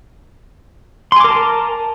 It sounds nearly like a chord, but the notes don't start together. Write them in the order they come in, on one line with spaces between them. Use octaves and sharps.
C6 G#5 D6 A#4 A5